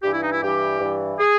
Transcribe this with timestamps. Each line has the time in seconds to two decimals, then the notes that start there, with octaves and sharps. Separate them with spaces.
0.03 G2 G4
0.07 E3
0.13 E4
0.23 D#4
0.32 E4
0.43 G2 E3 G4
0.80 G2 E3
1.20 G#4